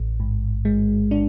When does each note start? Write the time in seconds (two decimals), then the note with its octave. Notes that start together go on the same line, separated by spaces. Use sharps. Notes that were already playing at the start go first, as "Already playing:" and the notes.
Already playing: A1
0.20 G#2
0.65 G#3
1.11 D4